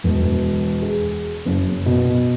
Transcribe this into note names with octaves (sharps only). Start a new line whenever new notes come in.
E1
G#4
F#1
B2